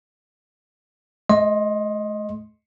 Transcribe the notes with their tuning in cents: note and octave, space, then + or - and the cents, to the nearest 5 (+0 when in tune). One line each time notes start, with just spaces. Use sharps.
A3 -45 D#5 +0 C6 +20